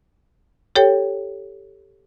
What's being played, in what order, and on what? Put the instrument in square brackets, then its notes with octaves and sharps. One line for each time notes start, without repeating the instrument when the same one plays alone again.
[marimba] G4 A4 C#5 G5